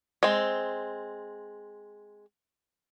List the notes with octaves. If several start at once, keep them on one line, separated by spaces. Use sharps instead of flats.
G#3 C4